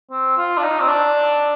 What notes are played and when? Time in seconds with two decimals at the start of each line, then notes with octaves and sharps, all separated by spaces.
0.11 C4
0.37 F4
0.57 D4
0.63 D#4
0.79 C4
0.88 D4